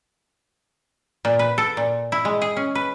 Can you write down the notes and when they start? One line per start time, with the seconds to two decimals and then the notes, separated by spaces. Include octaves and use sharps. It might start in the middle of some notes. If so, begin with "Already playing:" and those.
1.25 A#2
1.39 B4
1.58 A4
1.77 A#2
2.12 E4
2.25 G#3
2.42 G#4
2.57 C#4
2.75 B4